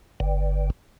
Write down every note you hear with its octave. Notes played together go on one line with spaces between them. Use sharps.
G1